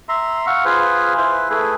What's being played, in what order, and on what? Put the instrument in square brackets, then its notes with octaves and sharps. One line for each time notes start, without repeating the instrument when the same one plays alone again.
[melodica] E5 A#5 C6
F5 F#5 C#6
F4 G#4 B4 C5
E4 B4 C5
A3 E4 G#4 B4